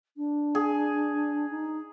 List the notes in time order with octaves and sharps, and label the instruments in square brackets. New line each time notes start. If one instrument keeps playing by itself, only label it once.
[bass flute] D4
[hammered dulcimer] G#4
[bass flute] D#4